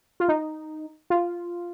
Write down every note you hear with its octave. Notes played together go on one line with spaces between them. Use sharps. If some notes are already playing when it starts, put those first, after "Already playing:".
F4
D#4
F4